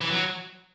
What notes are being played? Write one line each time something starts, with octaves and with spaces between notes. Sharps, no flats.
E3
F#3